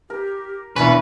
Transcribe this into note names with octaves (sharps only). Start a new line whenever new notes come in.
G4 A#4
D#2 B2 E3 C#4 D4 E4 B4